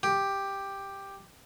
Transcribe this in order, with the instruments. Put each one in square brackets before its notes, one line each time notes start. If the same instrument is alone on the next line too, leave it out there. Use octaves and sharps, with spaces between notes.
[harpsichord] G4